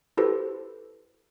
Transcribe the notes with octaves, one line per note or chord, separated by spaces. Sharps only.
E4 F#4 G4 A4 B4 C5